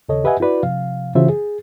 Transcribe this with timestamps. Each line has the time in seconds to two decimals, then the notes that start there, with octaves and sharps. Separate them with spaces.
0.09 D#2 C#3 A4 C#5 D#5
0.24 G4 B4 D#5 E5 F#5 G#5
0.40 E4 F#4 B4 D5
0.63 C3 F3 F5
1.15 C#3 E3 F4 F#4 C5 E5
1.29 G#4